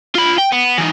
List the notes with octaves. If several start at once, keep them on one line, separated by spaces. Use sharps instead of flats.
F4 B5
G5
B3
E3 D#4